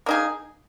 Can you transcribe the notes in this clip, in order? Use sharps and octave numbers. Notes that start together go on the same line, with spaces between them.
A#3 D#4 G#4